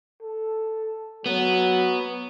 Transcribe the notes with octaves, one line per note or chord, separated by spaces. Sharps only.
A4
F#3 B3